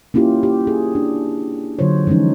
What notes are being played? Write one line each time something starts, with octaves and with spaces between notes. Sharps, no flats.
A#3 C#4 E4 F4 G4
G4
G#4
D4
D3 F#3 F4 C5 C#5
E3 F3 G#3 C#4 D#4